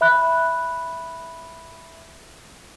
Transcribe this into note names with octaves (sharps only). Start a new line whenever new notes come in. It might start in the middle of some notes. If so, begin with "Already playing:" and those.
E5 B5 F#6